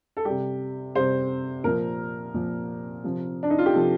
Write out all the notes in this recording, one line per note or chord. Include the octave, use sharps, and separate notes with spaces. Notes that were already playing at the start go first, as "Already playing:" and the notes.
A4
C3 G3 G4
C3 G3 C5
A#2 F3 A#4
A#2 F3
C3 F3
D4
D#4
F4
G4
C3 F3 A4